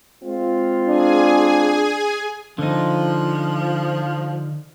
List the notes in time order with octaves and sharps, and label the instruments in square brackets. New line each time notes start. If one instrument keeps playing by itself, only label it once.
[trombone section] G#3 C4 F4
[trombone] D4 [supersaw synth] G#4 G#5
[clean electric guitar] D3 D#4 [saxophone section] F3